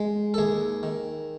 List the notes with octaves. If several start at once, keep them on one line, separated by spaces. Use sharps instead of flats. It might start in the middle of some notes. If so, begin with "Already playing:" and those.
Already playing: G#3
A4
D#2 G#4
D#3